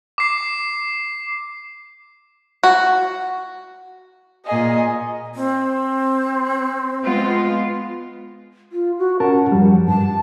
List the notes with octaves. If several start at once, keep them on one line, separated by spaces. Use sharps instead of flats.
D6 C7
F#4
A#2 G#4 D#5
C4
G#3 B3 F4
F4
F#4
C#4 A#4 F#5 A5
F#2 F3 G3
G2 A5